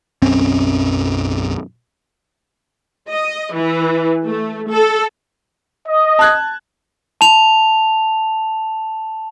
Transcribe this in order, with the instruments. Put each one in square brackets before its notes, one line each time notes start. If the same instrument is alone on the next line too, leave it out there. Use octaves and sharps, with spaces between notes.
[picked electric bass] B1 F#2 C4 C#4
[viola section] D#5
E3
A3
A4
[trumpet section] D#5
[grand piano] A5 F#6 G#6
[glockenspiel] A5 F7